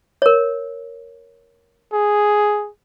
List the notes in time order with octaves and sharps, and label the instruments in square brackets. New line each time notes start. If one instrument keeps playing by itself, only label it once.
[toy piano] A#4 C#5
[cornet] G#4